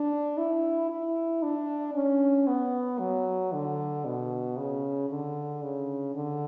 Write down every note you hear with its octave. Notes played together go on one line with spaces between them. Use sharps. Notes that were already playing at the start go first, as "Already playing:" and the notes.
Already playing: D4
E4
E4
D4
C#4
B3
F#3
D3
B2
C#3
D3
C#3
D3